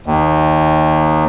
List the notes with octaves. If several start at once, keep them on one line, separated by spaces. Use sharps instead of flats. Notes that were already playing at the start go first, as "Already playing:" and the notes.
D#2